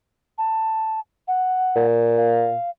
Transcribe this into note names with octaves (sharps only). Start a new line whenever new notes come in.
A5
F#5
A#2
F5